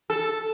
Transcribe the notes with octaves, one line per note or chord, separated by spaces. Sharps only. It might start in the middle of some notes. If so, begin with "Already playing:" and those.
A4